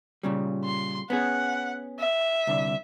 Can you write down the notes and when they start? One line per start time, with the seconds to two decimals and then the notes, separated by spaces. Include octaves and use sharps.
0.23 A#2 C#3 G3
0.64 C6
1.10 B3 C#4 G#4 F#5
1.99 E5
2.47 C2 D3